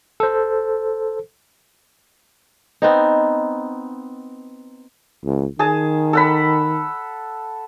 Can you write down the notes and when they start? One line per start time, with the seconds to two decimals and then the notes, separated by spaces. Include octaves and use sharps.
0.20 A4 C5
2.82 B3 C4 D#4
5.25 C#2
5.59 D#3 G#4 A5
6.13 A4 F#5 B5